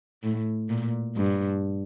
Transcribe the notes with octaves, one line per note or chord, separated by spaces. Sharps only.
A2
A#2
G2